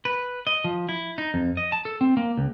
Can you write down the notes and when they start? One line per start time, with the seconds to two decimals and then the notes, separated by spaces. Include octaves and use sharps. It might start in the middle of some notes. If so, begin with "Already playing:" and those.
0.05 B4
0.47 D#5
0.64 F3
0.89 E4
1.18 D#4
1.34 F2
1.57 D#5
1.72 A5
1.85 A4
2.01 C4
2.17 A#3
2.37 C#2